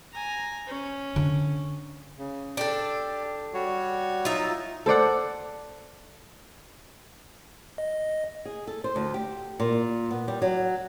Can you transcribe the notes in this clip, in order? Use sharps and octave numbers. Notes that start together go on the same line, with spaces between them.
G#5 A#5
C#4
D3
C#3
D4 G4 A4
G3 F#4 C#5
F#3 D#4 F4 E5
A4 C5 D5 F#5
D#5
G#4
A4
C5
D2
G4
A#2
B3
G3
F#3